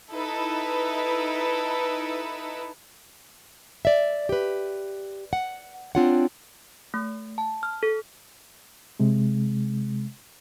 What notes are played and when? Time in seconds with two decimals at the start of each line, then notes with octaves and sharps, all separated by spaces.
0.11 D#4 E4 A4 B4
3.85 D5 E5
4.29 G4 B4
5.33 F#5
5.95 C4 D4 F4 C#5 F#5
6.94 A3
7.38 A5
7.63 F6
7.83 A4
9.00 C3 G#3